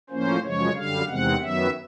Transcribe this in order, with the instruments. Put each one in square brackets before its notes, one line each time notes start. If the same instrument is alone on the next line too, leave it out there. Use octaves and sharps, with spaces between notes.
[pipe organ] A2 F3 A#3 C#4 C5
F#2 C#3 F3 G#3 C#5
F#2 D3 G3 F5
E2 C3 D#3 G#3 C4 F#5
F#2 D#3 F#3 B3 E5